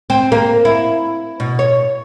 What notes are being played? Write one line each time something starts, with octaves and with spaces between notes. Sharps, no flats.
C4
A#3
E4
B2
C#5